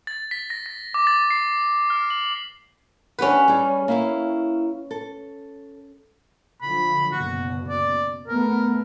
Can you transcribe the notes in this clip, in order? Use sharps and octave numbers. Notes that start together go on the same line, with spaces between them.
A6
B6
A#6
A#6
D6
A6
C7
A6
F6
F#7
C#4 D4 G4 B4 F#5
G3 G#4
A#3 E4 F5
A4
D3 F3 B5
F#1 B2 F#4
D5
A3 B3 A#4